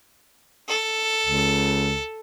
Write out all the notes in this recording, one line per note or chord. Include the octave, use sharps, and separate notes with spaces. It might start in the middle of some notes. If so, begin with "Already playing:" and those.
A4
C#2